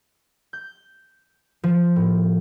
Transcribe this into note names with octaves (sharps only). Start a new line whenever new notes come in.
G6
F3
A2